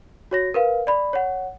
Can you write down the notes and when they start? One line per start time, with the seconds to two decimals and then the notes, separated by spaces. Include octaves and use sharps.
0.31 F#4 C#5 A#6
0.54 A#4 B4 F5
0.87 D5 B5
1.13 C#5 F#5